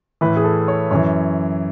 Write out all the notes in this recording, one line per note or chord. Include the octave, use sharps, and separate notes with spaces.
A2 E3 B4
G#4
A4
C#5
F#2 E3 C#5